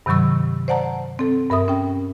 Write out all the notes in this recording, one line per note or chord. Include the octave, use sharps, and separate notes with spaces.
G2 C3 D#3 F#3 C#6 E6
C5 D5 F#5 A5 A#5
C4 A4
G2 A#4 E5 D#6
C#4 G5